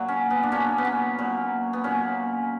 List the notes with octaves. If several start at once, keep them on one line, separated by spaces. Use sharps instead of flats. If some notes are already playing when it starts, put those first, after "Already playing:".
Already playing: A#2 F#3
C#4
B3
D4
A#2 F#3 C#4
B3
C#4
A#2 F#3
B3
A#2 F#3 C#4